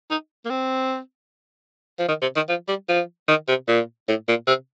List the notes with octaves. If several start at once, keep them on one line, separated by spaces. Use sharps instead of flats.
D#4
A#3
C4
F3
D#3
C3
D#3
F3
G3
F3
D#3
C3
A#2
A2
A#2
C3